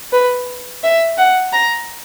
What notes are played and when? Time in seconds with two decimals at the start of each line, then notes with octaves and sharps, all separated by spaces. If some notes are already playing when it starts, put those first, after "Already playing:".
0.13 B4
0.83 E5
1.18 F#5
1.52 A#5